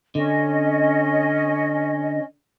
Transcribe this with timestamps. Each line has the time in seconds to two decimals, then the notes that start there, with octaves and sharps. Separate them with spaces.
0.15 D3 C#4 D#5